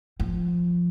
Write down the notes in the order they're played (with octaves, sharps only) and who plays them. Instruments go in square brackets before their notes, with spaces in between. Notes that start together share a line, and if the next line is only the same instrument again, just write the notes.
[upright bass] F3